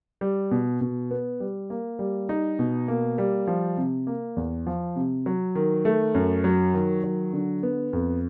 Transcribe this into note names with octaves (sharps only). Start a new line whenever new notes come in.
G3
B2
B2
B3
G3
A#3
G3
D#4
B2
A#3
G3
F3
C3
A#3
E2
F3
C3
F#3
D#3
A3
F#2
F#3
D#3
F#3
D3
B3
F2